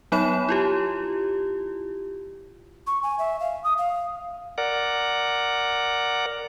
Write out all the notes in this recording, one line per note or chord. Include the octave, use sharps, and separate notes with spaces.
F#3 B3 D#4 C#5 B5 E7
E4 F4 G4
C#6
G#5
E5
F5
D#6
F5
A#4 D5 F#5